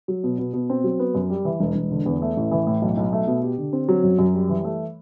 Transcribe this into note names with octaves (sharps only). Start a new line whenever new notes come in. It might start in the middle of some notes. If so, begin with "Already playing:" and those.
F#3
B2
B2
B2
C4
F#3
B3
F#2
G3
E3
E1
E1
D3
E2
A3
A1
E3
A2
B1
B1
A3
B2
G4
D3
C4
F#3
F#2
F#2
G3
E3
A3